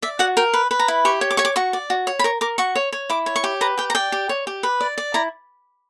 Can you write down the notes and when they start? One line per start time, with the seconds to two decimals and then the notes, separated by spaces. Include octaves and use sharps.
0.02 D5 E5
0.19 F#4 F#5
0.37 A#4 G5
0.54 B4
0.71 B4
0.79 A#5
0.88 E4
1.05 G4 C#6
1.21 C#5
1.31 D6
1.37 C#5 C#6
1.45 D6
1.56 F#4 C#6
1.73 D5
1.90 F#4
2.07 C#5
2.19 B5
2.24 A#4 C#6
2.41 A#4 D6
2.58 F#4 C#6
2.76 C#5
2.92 C#5
3.10 E4 D6
3.26 C#5
3.36 C#6
3.44 G4
3.61 B4 A#5
3.78 G4 G5
3.90 A#5
3.95 D5 G5
4.12 G4
4.29 C#5
4.47 G4
4.63 B4
4.81 D5
4.98 D5
5.14 E4 A#5